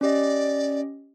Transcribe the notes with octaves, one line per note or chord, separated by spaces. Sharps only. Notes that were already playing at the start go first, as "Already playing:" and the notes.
C#4 G4 D5 D#5